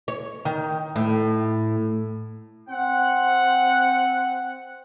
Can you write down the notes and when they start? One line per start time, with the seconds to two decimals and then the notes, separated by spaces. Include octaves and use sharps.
0.08 C#5
0.45 D#3
0.96 A2
2.69 C4 F#5